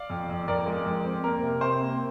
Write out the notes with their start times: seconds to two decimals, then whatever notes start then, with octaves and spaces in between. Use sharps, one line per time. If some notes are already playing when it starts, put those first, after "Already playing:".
Already playing: D5 F5
0.10 F2
0.29 F2
0.48 F2 A#4 D5
0.66 G#3
0.86 F2
1.05 C4
1.24 A#3 A#4
1.43 C3
1.61 C3 C5
1.81 A#3